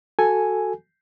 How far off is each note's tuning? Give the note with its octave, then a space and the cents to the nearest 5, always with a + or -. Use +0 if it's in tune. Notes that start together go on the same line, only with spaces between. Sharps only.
F#4 +0 A4 +0 G#5 +0